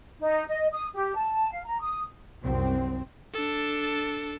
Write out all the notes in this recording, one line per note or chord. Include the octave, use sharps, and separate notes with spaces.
D#4
D#5
D#6
G4
A5
F5
A#5
D#6
C2 F#2 C4
D4 A4